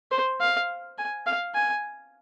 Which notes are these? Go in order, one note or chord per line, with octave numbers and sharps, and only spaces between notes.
C5
F5
G#5
F5
G#5